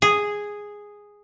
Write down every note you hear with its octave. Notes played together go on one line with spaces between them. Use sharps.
G#4